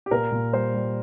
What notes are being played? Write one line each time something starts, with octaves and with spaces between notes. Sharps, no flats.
G4
A#2 A#4
A#2
G3 C5
G3